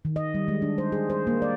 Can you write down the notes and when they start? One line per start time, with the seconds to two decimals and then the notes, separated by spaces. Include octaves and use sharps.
0.05 D#3
0.16 D#5
0.34 G3
0.48 G#3
0.62 D4
0.78 C5
0.92 G#4
1.10 C5
1.27 A#3
1.42 D5